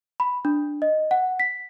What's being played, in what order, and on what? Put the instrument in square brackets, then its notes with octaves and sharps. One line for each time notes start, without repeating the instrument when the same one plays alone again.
[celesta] B5
D4
D#5
F#5
B6